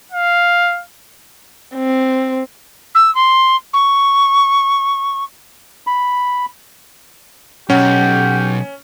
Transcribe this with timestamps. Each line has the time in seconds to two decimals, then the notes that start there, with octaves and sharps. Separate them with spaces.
0.12 F5
1.75 C4
2.95 E6
3.15 C6
3.73 C#6
5.87 B5
7.70 B1 C#4 G4 F#5